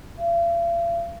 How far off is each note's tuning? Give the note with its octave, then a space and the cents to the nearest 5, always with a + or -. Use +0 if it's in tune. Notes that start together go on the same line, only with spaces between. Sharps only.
F5 -45